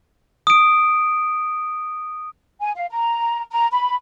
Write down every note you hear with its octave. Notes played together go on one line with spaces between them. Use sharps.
D#6 D7
G#5
F5
A#5
A#5
B5